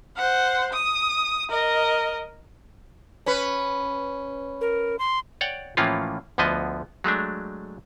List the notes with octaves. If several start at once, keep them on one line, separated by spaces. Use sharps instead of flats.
C5 F#5
D#6
A#4 D#5
C#4 B4
A#4
C6
C#5 D5 F#5 G5
A2 E3 F3 A#3 C#4 F4
D2 D3 F3 B3 D#5
F#3 G#3 A3 D4